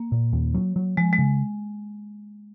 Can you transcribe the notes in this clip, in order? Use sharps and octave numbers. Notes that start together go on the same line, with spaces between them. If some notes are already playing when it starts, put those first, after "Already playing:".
Already playing: A#3
A#2
D#2
F#3
F#3
F3 G#3
G#3
C#3